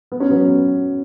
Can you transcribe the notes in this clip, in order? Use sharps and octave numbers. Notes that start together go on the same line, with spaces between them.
B3
C#4
F#3 B3